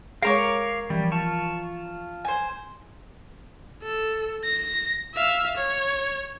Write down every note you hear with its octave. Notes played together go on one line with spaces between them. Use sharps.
G#3 G#4 A#4 C5 C#5 F5 A#5 D6
E3 F3 G3 C4
F4 A5 C#6
C5 G#5
A4
A#6
E5 F5
C#5